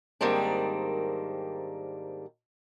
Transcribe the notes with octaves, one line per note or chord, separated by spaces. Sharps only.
G#2 D#3 G3 A#3 C4 D4